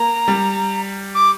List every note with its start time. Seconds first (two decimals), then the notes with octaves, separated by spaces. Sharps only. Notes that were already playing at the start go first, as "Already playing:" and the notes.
Already playing: A#3 A#5
0.28 G3
1.14 D6